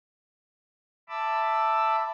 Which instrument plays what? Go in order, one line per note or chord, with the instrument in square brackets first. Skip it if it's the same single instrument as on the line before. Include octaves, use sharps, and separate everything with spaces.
[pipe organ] E5 A5 B5 D6 E6